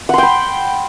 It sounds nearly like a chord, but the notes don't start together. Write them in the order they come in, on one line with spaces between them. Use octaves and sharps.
F#5 C6 G5 B5